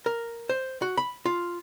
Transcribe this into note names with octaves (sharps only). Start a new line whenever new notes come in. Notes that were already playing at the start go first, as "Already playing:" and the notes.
A#4
C5
F#4
B5
F4